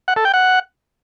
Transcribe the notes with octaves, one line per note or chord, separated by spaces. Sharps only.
F#5
A4
G5
F#5